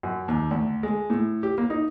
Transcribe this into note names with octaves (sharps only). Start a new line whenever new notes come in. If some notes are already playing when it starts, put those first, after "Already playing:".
F#2
D#2
D2
G#3
A2
G4
A#3
D#4